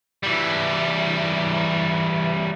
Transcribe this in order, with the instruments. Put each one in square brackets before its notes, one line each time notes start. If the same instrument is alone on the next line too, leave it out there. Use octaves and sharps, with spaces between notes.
[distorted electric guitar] E3 G3